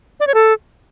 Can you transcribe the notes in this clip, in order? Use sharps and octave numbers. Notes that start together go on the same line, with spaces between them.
D5
C#5
A4